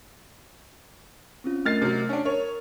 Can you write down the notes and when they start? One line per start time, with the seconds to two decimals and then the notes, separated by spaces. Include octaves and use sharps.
1.44 C4 C#4 F4
1.66 A3 A#4 D#5 F6 A6 C7
1.82 C3 F#3
2.09 C#4 D4
2.25 A#4 C#5